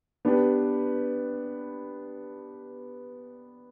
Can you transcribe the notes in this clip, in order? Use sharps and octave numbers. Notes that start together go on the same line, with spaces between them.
B3 D4 G4 B4